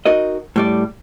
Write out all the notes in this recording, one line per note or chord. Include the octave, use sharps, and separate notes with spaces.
D#4 F#4 A#4 D#5
A2 G3 D5